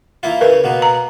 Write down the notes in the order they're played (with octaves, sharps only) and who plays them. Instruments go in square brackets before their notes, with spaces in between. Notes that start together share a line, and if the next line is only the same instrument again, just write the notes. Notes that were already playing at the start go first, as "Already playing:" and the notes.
[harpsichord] A#3 E4 F4
[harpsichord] C#3 C#4 [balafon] A#4 B4
[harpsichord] B2 A#3 B3
[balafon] A#5